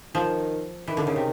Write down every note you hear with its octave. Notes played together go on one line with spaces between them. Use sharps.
D#3 F3
D#3 E3
D3
C#3
C3